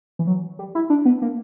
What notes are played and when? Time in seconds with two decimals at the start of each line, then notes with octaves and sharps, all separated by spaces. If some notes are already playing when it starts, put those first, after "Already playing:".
0.19 E3
0.27 F#3
0.59 G3
0.75 E4
0.90 D4
1.05 B3
1.22 A#3